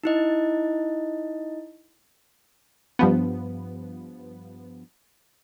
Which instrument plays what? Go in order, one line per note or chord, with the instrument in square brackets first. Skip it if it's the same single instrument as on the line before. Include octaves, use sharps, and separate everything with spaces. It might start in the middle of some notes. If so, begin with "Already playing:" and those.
[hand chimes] D#4 E4 D#5
[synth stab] G2 F3 B3